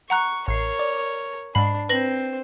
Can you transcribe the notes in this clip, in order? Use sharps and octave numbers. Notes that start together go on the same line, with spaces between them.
F#5 A#5 C#6 F#6
A1 A#4 C#5 C7
D5
G#2 D4 B5 C7
C4 B4 C5 A#6 F#7